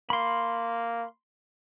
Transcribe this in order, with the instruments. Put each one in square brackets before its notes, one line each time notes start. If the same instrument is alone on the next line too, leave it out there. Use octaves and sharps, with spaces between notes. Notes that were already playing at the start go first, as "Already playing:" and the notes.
[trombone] A#3 [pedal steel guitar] B5 C6